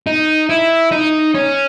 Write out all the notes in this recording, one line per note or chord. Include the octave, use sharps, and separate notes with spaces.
D#4
E4
D#4
C#4